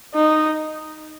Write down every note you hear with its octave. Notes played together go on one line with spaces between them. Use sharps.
D#4